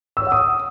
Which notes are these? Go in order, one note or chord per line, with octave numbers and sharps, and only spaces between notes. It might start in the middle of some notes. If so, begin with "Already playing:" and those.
E6
C#5
F#5
D#6